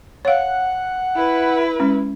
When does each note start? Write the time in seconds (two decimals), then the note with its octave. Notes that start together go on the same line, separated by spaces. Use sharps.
0.25 C#5 F5 F#5
1.16 E4 B4
1.80 G#3 C#4